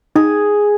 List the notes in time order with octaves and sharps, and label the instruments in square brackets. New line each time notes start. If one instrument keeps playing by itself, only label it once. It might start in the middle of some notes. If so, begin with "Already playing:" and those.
[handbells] D#4 [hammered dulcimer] G#4